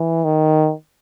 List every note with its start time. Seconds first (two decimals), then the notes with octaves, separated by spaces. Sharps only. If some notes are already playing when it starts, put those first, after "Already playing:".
Already playing: E3
0.24 D#3